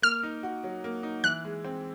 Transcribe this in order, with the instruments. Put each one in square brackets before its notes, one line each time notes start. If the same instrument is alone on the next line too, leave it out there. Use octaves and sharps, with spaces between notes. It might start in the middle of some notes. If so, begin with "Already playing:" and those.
[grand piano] A#3 [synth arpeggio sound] F6
[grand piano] D#4
F#4
F#3
A#3
D#4
[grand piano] E3 [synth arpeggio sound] F#6
[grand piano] G#3
C4